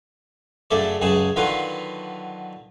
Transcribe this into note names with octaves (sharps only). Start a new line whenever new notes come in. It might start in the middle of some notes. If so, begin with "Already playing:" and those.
F#2 C#3 A3 A4 D5
C#2 F#2 C#3 G#4 A5
D3 D#3 F#3 F4 B4 F5